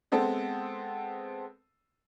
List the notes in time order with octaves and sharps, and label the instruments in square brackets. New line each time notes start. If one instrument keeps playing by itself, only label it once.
[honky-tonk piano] G#3 B3 C4 A4